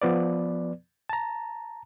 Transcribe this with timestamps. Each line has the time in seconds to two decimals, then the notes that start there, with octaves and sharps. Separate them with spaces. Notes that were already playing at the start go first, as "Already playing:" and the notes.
0.02 F3 B3 B4 D5
1.09 A5 A#5